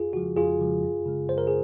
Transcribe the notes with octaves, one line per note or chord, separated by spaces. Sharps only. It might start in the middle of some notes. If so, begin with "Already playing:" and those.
Already playing: F2 F4 G#4
C#3 F3 G#3 F#4
F2 F4 G#4
C#3 F3 G#3
F#2
C#3 G#3
F#2 C5
A#4
G#4